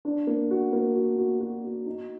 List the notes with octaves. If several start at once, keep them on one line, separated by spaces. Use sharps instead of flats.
D4
A#3
F#4
A#3
F#4
F#4
F#4
F#4
D#4